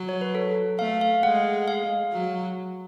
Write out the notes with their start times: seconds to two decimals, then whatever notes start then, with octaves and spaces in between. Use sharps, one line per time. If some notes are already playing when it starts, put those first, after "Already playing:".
Already playing: F#3
0.09 C#5
0.21 B4
0.35 A4
0.79 A3 F5
1.01 F5
1.23 G#3 F#5
1.68 F5
2.13 F#3